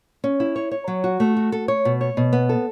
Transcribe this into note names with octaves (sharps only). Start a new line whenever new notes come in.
C#4
E4
C#5
C#5
F#3
F#4
A3
F#4
A4
C#5
B2
C#5
B2
B3
A4